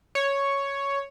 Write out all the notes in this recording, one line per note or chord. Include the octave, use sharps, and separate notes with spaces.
C#5